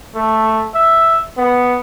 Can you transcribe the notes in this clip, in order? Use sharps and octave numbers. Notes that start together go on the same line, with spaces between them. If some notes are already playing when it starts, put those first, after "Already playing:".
A3
E5
B3